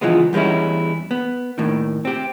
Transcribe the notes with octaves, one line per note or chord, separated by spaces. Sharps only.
C#2 E3 F3 G#3 B3
E2 G3 G#3 C#4 E4
B3
D#2 A2 D#3
C4 G4